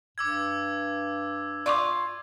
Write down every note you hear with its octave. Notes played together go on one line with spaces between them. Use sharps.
G2 D6 E6 G#6
F4 D5 C#6 D6